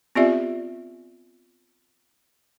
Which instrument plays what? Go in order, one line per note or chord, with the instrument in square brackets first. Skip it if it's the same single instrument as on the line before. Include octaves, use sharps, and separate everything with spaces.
[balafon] B3 C4 F4 G4 D5 E5